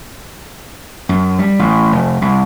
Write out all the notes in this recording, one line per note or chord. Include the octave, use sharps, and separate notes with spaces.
F#2
G3
A1
F1
C2